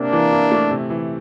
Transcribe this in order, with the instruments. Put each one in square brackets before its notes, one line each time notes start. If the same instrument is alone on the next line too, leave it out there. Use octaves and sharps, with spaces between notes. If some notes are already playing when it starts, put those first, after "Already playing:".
Already playing: [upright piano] C3 [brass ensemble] A#3 D4
[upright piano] E3
E4
A3
C3
E3